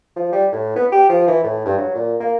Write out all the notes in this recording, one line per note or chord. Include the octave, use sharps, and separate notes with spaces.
F3
G3
A2
B3
G4
F3
E3
A2
G2
F#3
A#2
A#3